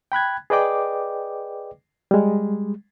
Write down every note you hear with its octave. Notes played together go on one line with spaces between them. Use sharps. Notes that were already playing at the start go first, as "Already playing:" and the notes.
G5 B5 F#6 G#6
G#4 B4 D5 D#5 G5 D6
G3 G#3